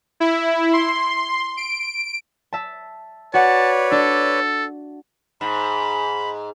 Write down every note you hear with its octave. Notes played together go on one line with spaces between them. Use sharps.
E4
C6
D7
E5 A5
F#4 B4 C#5 D5 F#5 A5
D4 A4
G#2 B5